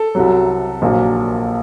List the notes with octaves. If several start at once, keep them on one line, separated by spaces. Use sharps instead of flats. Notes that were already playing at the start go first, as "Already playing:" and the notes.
Already playing: A4
C2 C3 F#3
A#1 A#2 F#3